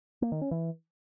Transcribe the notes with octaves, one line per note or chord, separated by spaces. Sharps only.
A#3
D#3
C#4
E3